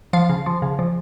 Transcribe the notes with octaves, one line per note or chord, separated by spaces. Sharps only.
F3 F5
C#3
F3
C#3
F3